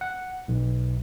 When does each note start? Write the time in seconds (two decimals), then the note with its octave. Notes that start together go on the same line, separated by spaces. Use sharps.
0.01 F#5
0.48 B1